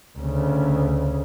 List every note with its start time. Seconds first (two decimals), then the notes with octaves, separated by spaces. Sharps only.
0.19 D2 C#3